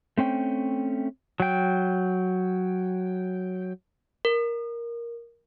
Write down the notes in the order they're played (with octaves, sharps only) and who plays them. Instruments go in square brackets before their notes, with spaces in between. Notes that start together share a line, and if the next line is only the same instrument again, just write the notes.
[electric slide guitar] A3 C4 C#4 G5
[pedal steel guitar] F#3 G5
[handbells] A#4